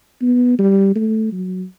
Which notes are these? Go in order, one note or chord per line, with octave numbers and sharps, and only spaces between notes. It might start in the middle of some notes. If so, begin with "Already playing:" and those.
B3
G3
A3
F#3